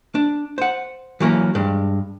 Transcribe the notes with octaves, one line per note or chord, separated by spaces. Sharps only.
D4
C5 F#5
E3 F#3 A#3 C#4
G2 G#3